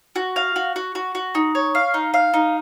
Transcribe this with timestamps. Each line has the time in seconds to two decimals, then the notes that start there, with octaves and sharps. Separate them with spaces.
0.16 F#4
0.36 F5
0.56 F#4
0.76 F#4
0.95 F#4
1.15 F#4
1.35 D#4
1.55 C#5
1.75 F5
1.94 D#4
2.14 F5
2.34 D#4